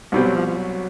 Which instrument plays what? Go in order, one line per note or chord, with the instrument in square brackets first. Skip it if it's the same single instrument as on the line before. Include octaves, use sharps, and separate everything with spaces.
[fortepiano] C2 B2 G3 C4 [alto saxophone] F#3
[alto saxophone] F#3
F3
F3
F#3